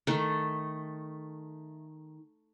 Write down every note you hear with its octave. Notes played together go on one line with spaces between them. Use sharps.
D#3 A3